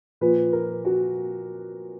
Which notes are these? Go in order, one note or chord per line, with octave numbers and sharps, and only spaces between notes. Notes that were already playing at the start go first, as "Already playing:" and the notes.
A#2 F3 B4
A#4
F#4